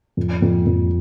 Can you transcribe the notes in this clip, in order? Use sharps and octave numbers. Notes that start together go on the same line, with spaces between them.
F2
F2
F2